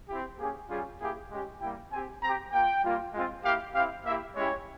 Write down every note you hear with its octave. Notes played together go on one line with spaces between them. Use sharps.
C4 E4 G4
A#3 C#4 G4 G#4
G3 C#4 F4 G#4
A#3 E4 G4 G#4
G#3 C#4 G4
G3 A#3 E4 G5
C4 G4 G#5
C4 G4 A#5
A#3 F4 G5
G3 A#3 F4
G#3 C4 F4
A#3 E4 G4 F5
C4 E4 G4 F5
A#3 E4 G4 E5
G#3 C#4 E4 G4 C#5